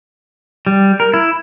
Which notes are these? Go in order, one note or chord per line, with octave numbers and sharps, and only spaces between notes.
G3
A#4
E4